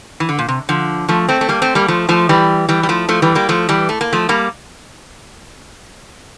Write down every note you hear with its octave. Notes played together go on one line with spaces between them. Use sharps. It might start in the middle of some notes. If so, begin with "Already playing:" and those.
E3
D3
A#2
C3
D3 F3
F3 A3
A3 C4
A3
G3 A#3
A3 C4
G3 A#3
F3 A3
F3 A3
E3 G3
E3 G3
G3
F3 A3
F3 A3
E3 G3
G3 A#3
F3 A3
E3 G3
A3
A#3
F3 A3
G3 A#3